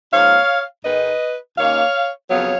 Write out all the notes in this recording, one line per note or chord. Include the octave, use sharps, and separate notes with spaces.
G#2 F3 A#3 C#5 F5
G#2 D#3 G#3 D#4 B4 D#5
D#2 D#3 A#3 C#4 C#5 F5
F2 C#3 F#3 B3 C#5 F5